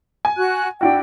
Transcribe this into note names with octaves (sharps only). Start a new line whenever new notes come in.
G#5
F#4 F#6
D4 E4 F#4 G5